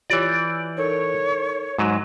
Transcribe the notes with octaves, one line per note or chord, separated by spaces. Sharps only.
E3 F4 G4 C#5 D5
G6 D7
D#4 A4 A#4 C#5
G#2 F#3